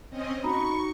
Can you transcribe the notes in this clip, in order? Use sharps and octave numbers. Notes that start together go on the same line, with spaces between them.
C4 C#4 D#5
D#4 F#4 B5 C#6